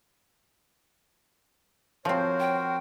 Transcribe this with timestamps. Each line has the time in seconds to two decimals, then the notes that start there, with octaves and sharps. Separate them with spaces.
2.05 F3 C4 F#4 A#4 C5 C#5
2.40 G5